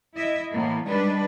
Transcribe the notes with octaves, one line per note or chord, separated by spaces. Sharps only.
E4 D#5 E5
A2 E3 A#3 B3
D#3 G3 G#3 D4 B4